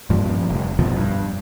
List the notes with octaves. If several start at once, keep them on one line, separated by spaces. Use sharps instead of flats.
G2 A#2 F3
F1
B1 F2 B2 F3
G2